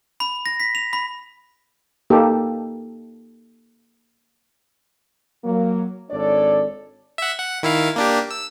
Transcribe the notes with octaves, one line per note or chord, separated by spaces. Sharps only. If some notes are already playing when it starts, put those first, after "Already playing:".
B5
A#6
B6
F7
B5
A#3 D#4 G4 A4
F#3 A#3
G#1 D4 A4 C#5 D5
E5 F#5
F#5
D#3 E4 F5
A#3 D4 G4
E6